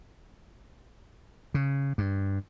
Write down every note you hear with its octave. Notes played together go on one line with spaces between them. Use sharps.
C#3
G2